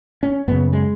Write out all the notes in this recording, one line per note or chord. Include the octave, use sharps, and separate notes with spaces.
C#4
F#2 C#3 B3
G#3